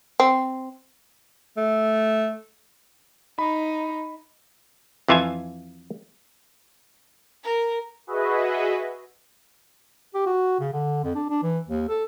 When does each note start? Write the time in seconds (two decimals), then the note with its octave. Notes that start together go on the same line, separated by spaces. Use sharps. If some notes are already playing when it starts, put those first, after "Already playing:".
0.20 C4
1.57 A3
3.39 D#4 B5
5.08 F2 E3 F4 E5 G#5
7.43 A#4
8.07 F#4 G#4 B4 D#5 E5
10.15 G4
10.26 F#4
10.60 C#3
10.73 D3
11.04 F2
11.15 D4
11.30 D4
11.43 E3
11.67 D#2
11.89 A4